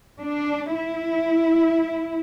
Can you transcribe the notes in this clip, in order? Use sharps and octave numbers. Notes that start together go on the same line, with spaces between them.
D4
E4